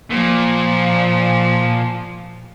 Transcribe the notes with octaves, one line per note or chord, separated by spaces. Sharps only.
A#2 F3